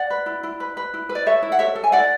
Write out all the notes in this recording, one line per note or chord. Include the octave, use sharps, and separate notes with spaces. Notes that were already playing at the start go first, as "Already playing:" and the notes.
Already playing: D5 F#5
B4
E4
E4
B4
B4
E4
B4
D5
A4 C#5 E5
E4
F#5
A4 C#5 E5
A4
G#5
E4 D5 F#5